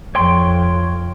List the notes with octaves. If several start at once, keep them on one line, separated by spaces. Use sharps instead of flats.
F2 C#5 G5 C6